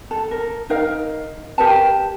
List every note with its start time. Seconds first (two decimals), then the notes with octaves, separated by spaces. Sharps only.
0.11 A4
0.31 A#4
0.70 D#4 A#4 F5
1.58 G4 A#4 B4 A5